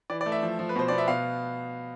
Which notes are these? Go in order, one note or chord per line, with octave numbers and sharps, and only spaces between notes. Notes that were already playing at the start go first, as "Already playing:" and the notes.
E3 D5
D5
A3
E5
F3
F3
B4
B2 C5
B3 D5
E5
B2 F5